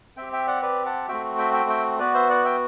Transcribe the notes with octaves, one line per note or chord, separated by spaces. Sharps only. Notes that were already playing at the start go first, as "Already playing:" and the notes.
C4 G4 E5 G5
E5 G5
D5 F#5
B4 D5
F#5 A5
A3 C4 F#4 E5 G5
E5 G5
E5 G5
E5 G5
B3 F#4 B4 D5
C5 E5
D5 F#5
E5 G5